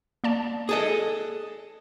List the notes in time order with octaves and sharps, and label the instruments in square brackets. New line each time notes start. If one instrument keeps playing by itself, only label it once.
[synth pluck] A#3 D5 A5
[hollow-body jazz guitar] G#4 A4 D#5